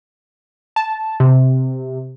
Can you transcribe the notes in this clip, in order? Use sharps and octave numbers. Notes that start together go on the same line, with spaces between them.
A5
C3